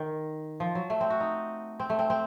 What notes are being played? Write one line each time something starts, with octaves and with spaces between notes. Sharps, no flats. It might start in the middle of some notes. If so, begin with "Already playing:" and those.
Already playing: D#3
F3
F#3
A3
C4
F#4
D#4
C4
A3
C4
C4